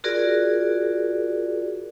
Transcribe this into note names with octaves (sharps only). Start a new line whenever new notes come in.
F4 F#4 G#4 A#4 D5